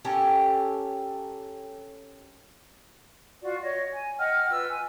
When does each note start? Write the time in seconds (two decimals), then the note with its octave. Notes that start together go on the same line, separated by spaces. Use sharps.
0.05 C#4 G4 A4 A#4
3.42 F4 F#4 D5
3.62 C#5 D#5
3.92 G#5
4.18 D#5 F#5 G5 F6
4.49 F4 B4 E6
4.69 G#5